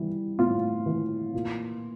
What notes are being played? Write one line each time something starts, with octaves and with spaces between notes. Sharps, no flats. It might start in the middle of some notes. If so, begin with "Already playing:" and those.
Already playing: E3 G3
A2 F4
E3
A#2